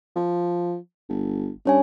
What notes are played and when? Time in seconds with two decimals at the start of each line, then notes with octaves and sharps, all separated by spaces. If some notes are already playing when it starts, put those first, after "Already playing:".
0.16 F3
1.09 G1
1.65 G2 C#4 C#5 G#5